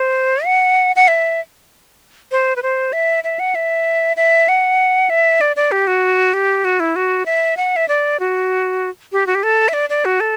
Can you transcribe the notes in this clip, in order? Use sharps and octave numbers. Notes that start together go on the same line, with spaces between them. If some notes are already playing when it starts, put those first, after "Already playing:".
Already playing: C5
F#5
F#5
E5
C5
B4
C5
E5
E5
F#5
E5
E5
F#5
E5
D5
D5
G4
F#4
G4
F#4
E4
F#4
E5
F#5
E5
D5
F#4
G4
F#4
G4
A4
E5
D5
D5
F#4
A4